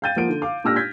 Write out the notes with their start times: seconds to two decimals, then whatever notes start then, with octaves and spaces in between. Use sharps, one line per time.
0.02 F5 G5 G6 A6 D#7
0.16 F3 A#3 F#5 D7
0.28 D3
0.42 F5 D6
0.64 A#2 D4 G4 E6 F6 A#6
0.76 G6 G#6 B6